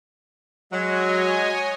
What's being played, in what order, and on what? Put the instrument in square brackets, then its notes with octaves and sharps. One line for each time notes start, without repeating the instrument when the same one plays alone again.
[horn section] F#3 [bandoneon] G#3 [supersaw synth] C#5 D#5 G#5